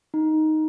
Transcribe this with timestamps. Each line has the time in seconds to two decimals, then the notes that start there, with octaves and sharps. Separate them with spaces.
0.14 D#4